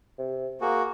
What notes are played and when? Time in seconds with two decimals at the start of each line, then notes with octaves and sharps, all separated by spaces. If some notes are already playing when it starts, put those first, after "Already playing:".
0.18 C3
0.61 A#3 F#4 G#4